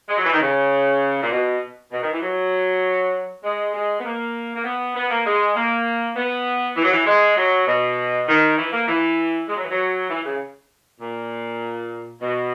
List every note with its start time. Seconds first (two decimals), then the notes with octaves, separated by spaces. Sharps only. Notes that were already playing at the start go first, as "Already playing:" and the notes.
0.09 G#3
0.16 F#3
0.25 E3
0.32 D#3
0.41 C#3
1.22 A#2
1.31 B2
1.92 B2
2.02 D#3
2.12 E3
2.22 F#3
3.43 G#3
3.73 G#3
3.99 B3
4.04 A#3
4.56 A#3
4.64 B3
4.95 B3
5.10 A#3
5.25 G#3
5.55 A#3
6.15 B3
6.76 E3
6.84 F#3
6.92 E3
7.06 G#3
7.37 F#3
7.67 B2
8.28 D#3
8.58 E3
8.73 A#3
8.88 E3
9.48 G#3
9.56 F#3
9.63 E3
9.70 F#3
10.09 E3
10.25 C#3
11.00 A#2
12.21 B2